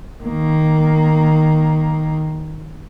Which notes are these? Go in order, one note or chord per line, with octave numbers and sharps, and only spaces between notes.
D#3 A#3